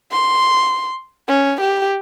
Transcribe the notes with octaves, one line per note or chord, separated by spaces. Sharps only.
C6
C#4
G4